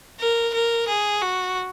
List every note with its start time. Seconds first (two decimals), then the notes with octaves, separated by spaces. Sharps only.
0.20 A#4
0.54 A#4
0.88 G#4
1.22 F#4